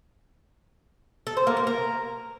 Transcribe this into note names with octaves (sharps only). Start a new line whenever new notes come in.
A4
C5
A#3
A#3
A#4